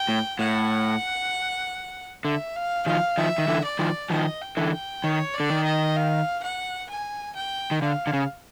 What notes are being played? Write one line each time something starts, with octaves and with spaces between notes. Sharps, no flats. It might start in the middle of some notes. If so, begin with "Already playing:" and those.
Already playing: G5
A2
A2 F#5
D3 E5
F5
D#3 F3 F5
D#3 F3 E5
D#3
D3 E3
D5
D#3 F3
D#3 F3 D#5
G5
D3 E3
G5
D#3 C#5
D5
D3
D#3
D#5
F5
F#5
G#5
G5
D#3
D3 F5
D3
C#3